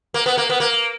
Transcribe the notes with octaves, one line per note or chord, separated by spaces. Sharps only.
A#3
B3
A#3
B3
A#3